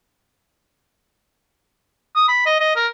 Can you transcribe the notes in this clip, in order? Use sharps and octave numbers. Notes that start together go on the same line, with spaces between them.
D#6
B5
D#5
D#5
A#4